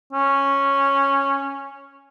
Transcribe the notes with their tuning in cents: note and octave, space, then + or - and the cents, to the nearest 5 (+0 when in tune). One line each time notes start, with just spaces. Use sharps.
C#4 -5